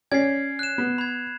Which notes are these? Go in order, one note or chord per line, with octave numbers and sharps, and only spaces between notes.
C#4 D5 G#6 C7
F#6 E7
B3
B5 G#6